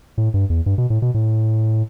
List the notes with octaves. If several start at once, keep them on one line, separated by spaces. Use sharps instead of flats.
A2
G2
E2
G2
B2
A2
B2
A2